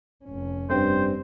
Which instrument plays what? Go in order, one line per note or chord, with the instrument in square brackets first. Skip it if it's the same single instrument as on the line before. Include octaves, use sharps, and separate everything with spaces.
[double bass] F1 C#4
[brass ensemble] G2 [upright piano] C4 G5 [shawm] C5